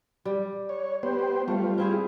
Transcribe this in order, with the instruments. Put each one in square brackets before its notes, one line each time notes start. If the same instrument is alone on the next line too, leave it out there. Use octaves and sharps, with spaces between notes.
[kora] G3
[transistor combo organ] C#5
B3 G4 C5
[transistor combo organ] G3 F4 [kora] A3
[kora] C4 E4 G#4